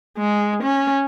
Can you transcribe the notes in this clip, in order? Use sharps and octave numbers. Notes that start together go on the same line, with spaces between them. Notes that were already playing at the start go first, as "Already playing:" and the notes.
G#3
C#4